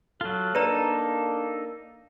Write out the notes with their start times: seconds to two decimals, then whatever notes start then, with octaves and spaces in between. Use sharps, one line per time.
0.21 F#3 F4 A4
0.55 A#3 D4 D#4 A4 B4 D5 A5 A#5